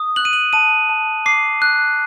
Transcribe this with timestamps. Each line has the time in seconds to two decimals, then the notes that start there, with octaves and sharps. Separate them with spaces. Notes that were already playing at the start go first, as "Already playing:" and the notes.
Already playing: D#6
0.16 F#6 F#7
0.25 D#7
0.33 F#7
0.53 A5 D#7
0.89 A5
1.26 D6 C7
1.62 F#6